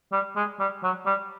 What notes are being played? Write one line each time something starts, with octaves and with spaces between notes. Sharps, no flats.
G3
G#3
G3
F#3
G3